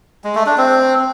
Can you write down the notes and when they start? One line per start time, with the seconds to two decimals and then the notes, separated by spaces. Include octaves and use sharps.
0.24 G#3
0.35 A3
0.46 D4
0.57 C4